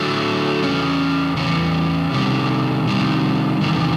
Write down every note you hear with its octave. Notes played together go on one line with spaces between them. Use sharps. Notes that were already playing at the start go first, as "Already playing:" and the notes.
Already playing: D3 F#3 A3
E2 C#3 C#4
E2 C#3 C#4
C3 D#3 G3 C4
C3 D#3 G3 C4
E2 C3 D#3